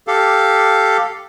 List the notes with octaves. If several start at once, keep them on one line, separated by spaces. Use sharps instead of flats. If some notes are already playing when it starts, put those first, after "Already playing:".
G4 A4 F5